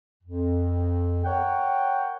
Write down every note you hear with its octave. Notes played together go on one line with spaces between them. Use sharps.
F2
A#4 C#5 F#5 G5